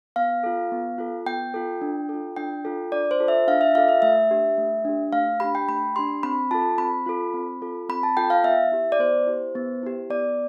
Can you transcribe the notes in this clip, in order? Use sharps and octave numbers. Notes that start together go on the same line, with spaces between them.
B3 F5
F4 A4
B3
F4 A4
B3 G5
F4 A4
D4
F4 A4
D4 G5
F4 A4
D4 D5
C5
F4 A4
E5
D4 F5
E5
F4 A4 F5
E5
A3 E5
D4 G4
A3
D4 G4
A3 F5
D4 G4 B5
G5
A3 B5
D4 G4 C6
C4 B5
F4 A4 A5
C4 B5
F4 A4
C4
F4 A4
C4 B5
A5
F4 A4 G5
F5
B3 E5
E4 G4
D5
B3 C5
E4 G4
B3
E4 G4
B3 D5